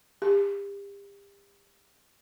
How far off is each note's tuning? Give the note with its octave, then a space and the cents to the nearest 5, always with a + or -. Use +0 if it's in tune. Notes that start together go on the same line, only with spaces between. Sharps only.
G4 +35